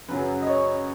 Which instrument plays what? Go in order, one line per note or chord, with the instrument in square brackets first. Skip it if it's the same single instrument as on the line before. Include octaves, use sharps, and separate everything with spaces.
[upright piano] F#2 C#3 F#3 B4
D#5
C#5